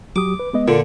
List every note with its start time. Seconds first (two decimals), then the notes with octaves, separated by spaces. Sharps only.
0.16 F#3 G4 D6 D#6
0.40 B4
0.53 G#3 B3 D#5
0.68 A#2 D3 F4 A#4